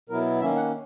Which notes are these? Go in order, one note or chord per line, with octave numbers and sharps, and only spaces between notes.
B2 F#3 B3 E4 A#4
D#3 A#3 C#4 E5
F#5